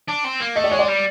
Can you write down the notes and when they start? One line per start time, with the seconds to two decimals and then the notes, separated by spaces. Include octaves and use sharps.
0.08 D4
0.24 C4
0.40 A#3
0.56 A3 D#5
0.64 D5
0.72 G#3 C#5
0.79 D5
0.88 G3